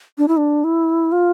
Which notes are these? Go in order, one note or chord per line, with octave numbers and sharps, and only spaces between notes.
D4
E4
D4
E4
F4